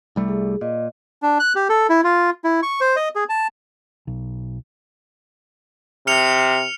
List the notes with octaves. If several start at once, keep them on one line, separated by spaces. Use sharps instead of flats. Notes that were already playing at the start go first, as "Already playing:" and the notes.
C2 G3 A3
G#4
A#2 D#5
D4
F#6
G4
A4
E4
F4
E4
C#6
C5
D#5
G#4
A5
B1
C3 F6 C#7 F7